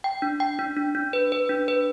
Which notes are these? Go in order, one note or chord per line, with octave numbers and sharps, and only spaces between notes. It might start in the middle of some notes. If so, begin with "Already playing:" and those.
G5
D4
G5
D4
D4
D4
B4
B4
D4
B4